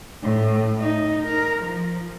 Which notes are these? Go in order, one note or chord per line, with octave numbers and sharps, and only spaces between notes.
A2
D#4
A#4
F3